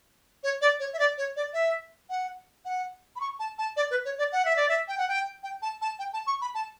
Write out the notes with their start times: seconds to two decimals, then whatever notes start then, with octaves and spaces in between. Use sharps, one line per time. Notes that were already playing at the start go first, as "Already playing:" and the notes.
0.43 C#5
0.61 D5
0.80 C#5
0.93 E5
0.99 D5
1.18 C#5
1.36 D5
1.54 E5
2.10 F#5
2.65 F#5
3.16 B5
3.21 C#6
3.39 A5
3.58 A5
3.77 D5
3.91 B4
4.05 C#5
4.18 D5
4.32 F#5
4.45 E5
4.56 D5
4.69 E5
4.88 G5
4.98 F#5
5.09 G5
5.43 G5
5.62 A5
5.82 A5
5.99 G5
6.13 A5
6.27 C#6
6.41 B5
6.55 A5